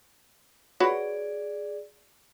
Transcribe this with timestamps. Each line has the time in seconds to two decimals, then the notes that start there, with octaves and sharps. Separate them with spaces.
0.80 F#4 G#4 B4 C#5 D5